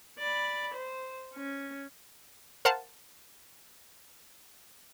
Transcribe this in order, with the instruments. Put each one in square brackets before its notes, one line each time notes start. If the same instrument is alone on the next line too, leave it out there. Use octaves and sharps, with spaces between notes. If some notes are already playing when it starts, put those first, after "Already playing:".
[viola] D5 B5
C5
C#4
[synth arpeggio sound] A#4 C5 F5 F#5 A5